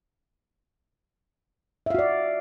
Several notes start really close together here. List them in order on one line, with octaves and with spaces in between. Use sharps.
E5 F5 F#4 D5